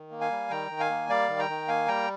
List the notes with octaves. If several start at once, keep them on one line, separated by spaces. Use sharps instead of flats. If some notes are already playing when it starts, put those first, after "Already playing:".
Already playing: D#3
A#3
F5 G#5
G3
D#3 G5 A#5
D#3
F5 G#5
A#3
G3 D5 F5
D#3
G5 A#5
D#3
A#3 F5 G#5
G3 G5 A#5